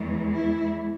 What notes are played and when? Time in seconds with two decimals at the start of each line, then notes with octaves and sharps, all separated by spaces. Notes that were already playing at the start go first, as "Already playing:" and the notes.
Already playing: E2 E3 G#3
0.33 E4